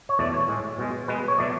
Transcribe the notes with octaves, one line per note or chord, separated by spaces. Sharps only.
C#5
E2 B2 A3 D5
C#5
A2 G#3
B2 G#3
B2 G#3 B4
C#5
B2 F#3 A3 D5